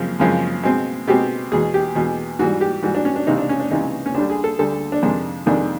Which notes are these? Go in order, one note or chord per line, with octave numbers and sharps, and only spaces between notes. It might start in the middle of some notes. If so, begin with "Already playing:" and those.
Already playing: F#2 C#3 F3 G#3 C4
F#2 C#3 F3 G#3 C4
B2 G#3 C4
B2 G#3 C4 G4
E2 B2 G#3 G#4
G4
E2 B2 G#3
G#2 E3 G3 F#4
G4
G#2 E3 G3 F#4
D4
C#4
D4
C#2 C3 E3 D#4
D4
C#4
D4
C#2 C3 E3 D#4
C#4
D2 D3 G3 D4
G#4
A4
D2 D3 G3 A4
D4
F2 C3 D#3 G#3 D4
F2 C3 D#3 G#3 D4